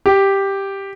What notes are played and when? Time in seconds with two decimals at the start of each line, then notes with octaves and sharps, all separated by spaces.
0.06 G4